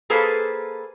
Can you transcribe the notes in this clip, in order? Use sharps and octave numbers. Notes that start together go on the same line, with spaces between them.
A#3 G#4 A4 B4 C5